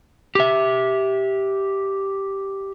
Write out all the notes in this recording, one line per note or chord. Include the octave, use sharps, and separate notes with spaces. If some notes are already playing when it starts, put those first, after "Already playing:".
G4 E5